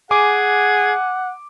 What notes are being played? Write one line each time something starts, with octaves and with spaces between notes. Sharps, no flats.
G#4 F#5 G#5 D6